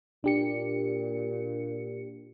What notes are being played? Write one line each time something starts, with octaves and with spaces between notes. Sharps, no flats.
A#2 D4 G4 C#7